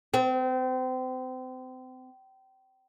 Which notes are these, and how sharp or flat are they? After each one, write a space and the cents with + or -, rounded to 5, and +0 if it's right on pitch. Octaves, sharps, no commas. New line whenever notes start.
C4 -30